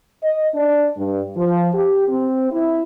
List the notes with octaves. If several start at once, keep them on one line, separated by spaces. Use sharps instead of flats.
D#5
D4
G2
F3
G4
C4
E4